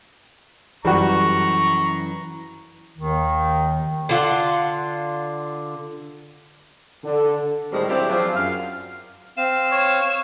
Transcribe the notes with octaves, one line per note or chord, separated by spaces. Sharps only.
F#2 E3 G3 F#4 A4 A#5 C#6
D#2 D#3
D3 F4 F#5
D3
A2 D#3 G3 G#3 C4
F#3 C4 D4 E4 G4
F3 F#3 C4 D4 F4 G#4
F#2 F5
C4 F5 E7
C#5